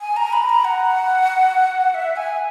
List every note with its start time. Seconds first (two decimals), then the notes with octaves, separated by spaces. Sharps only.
0.01 G#5
0.17 A#5
0.33 B5
0.49 A#5
0.64 F#5
1.94 E5
2.16 G#5